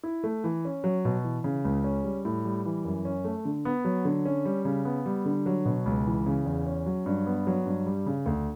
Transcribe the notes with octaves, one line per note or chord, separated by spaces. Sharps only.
E4
A3
E3
C#4
F#3
B2
E3
C#3
C#2
C#4
G3
A2
G3
E3
F#2
C#4
A3
D3
B3
F#3
D3
C#4
G3
C#3
B3
G3
D3
F#3
B2
C#2
E3
C#3
E2
C#4
F#3
G2
B3
F#3
G2
G3
C#3
D2